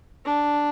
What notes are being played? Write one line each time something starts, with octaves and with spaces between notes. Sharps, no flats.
D4